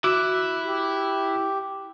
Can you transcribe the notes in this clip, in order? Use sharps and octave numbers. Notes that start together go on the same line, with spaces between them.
E4 F#4 E5 D6 E6 F#6
G4